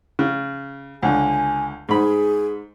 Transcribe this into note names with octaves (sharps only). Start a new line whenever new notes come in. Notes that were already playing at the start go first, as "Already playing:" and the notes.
C#3
C#2 D3 G#5
G#2 G#4 B5